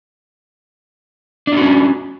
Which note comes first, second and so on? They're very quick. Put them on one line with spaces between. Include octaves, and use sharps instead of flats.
D4 F4 F#4 C#4